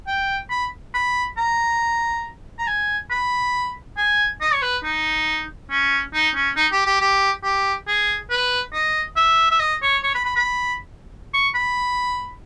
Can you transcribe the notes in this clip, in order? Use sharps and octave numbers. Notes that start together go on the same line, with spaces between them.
G5
B5
B5
A#5
A#5
G#5
B5
G#5
D#5
C#5
B4
D#4
C#4
D#4
C#4
D#4
G4
G4
G4
G4
G#4
B4
D#5
E5
E5
D#5
C#5
C#5
B5
B5
B5
C#6
B5